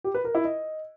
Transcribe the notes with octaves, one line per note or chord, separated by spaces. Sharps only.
G4
B4
A#4
E4
D#5